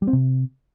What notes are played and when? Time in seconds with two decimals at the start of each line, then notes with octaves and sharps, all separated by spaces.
0.02 G3
0.07 C4
0.13 C3